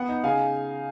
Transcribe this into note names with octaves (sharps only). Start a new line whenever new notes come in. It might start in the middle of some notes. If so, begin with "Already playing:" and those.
Already playing: B3 F#5
D#4
C#3 F5 G#5